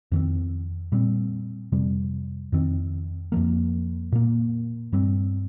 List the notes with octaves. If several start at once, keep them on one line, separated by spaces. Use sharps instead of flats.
F2 D#3 C4
A#2 G3 C4
F2 C3 G3
F2 D#3 C4
F2 F3 A#3
A#2 A#3
G2 G3 C4